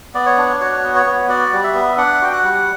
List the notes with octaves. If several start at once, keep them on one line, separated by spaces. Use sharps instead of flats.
B3 D5
C#5
D4
F#4 C#5
B3
C#5
B3
F#4 D5
G3
E5
B3
D4 F#5
F#4 G5
F#5
G3